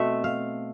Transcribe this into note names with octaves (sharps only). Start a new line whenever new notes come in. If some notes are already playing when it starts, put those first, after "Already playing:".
Already playing: B2 A3 C4 E5
F5